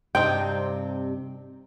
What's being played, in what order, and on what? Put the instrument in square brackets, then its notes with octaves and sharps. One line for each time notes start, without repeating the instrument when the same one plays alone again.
[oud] G2 C3 [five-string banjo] C4 D#4 [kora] G5